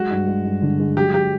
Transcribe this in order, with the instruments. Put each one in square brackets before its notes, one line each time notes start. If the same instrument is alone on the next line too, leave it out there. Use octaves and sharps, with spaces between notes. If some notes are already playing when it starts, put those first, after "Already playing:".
Already playing: [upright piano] F#3 G#3 [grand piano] F#4
[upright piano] G2
G#3
G2
D3
G#3
[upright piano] F#3 [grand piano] G4
[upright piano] F#3 [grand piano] G4